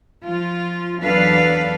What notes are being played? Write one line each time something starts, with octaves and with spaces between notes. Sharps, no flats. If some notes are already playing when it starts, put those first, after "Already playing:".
F3 F4
E2 F#3 D4 A4 B4 F5